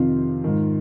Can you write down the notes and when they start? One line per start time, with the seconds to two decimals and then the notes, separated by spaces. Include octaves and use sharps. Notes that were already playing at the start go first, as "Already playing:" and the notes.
Already playing: F2 C3 D#3 F4
0.44 G#2 D#3